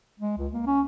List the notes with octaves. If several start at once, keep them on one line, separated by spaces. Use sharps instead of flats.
G#3
C#2
A#3
C#4